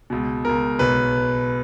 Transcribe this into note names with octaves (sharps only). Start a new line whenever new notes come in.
C#2 B2
C#2 B2 A#4
B1 B2 B4